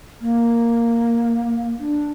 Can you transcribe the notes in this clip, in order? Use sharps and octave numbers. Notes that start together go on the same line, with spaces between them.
A#3
D4